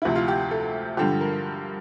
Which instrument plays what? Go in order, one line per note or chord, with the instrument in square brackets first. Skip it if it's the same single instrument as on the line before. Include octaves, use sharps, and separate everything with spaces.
[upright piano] D2 C3 F3 E4
F4
G4
A4
G2 D3 F3 G4
A#4